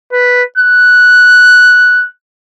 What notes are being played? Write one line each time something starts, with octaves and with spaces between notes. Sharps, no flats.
B4
F#6